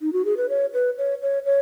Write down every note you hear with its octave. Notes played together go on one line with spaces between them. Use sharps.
D#4
F#4
G#4
B4
C#5
B4
C#5
C#5
C#5